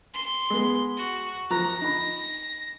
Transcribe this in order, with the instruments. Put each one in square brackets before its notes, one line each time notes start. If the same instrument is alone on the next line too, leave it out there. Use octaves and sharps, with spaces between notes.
[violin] C6
[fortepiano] G#3 B3
[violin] F#4
[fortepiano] F3 A#5 F#6 [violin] A#6
[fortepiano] D#4 B5